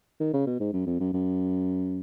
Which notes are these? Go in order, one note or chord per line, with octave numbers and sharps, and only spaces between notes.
D#3
C#3
B2
G#2
F#2
F2
F#2
F#2